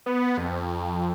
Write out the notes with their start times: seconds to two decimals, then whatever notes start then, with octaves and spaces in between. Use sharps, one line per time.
0.06 B3
0.37 F2